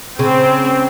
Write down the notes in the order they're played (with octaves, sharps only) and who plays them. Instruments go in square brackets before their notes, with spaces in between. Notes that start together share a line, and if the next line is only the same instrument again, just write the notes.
[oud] C#3 [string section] C4